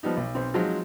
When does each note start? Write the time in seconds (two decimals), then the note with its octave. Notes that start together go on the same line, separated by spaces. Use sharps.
0.03 F3 G3 B3 D#4
0.17 B1
0.35 B1 C4
0.54 F3 F#3 G#3 C4 D#4 F4